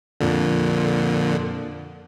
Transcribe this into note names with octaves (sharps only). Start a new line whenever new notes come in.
F2 A#2 D3